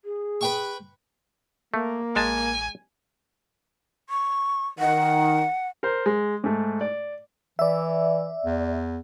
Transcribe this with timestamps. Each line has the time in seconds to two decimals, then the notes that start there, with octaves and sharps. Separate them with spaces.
0.05 G#4
0.41 B4 G5 C#6
1.74 A3 A#3
2.16 A1 G#3 G#5 A5
4.09 C#6
4.79 D#3 F#5
5.83 A#4 C5
6.06 G#3
6.44 G#2 A3
6.81 D5
7.59 E3 D5 E5
8.45 E2